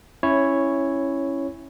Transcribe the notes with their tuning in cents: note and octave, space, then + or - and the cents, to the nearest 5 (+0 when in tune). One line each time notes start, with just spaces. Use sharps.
C#4 -15 E4 +0 C#5 +0